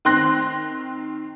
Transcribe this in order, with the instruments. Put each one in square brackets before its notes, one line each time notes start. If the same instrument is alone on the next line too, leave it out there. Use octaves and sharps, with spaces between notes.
[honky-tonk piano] D#3 C4 C6 F#6 A#6